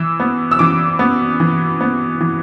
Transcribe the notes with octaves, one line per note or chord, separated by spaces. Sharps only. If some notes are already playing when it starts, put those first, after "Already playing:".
Already playing: E3 E6
B3
E6
E3 D6
B3
E3
B3
E3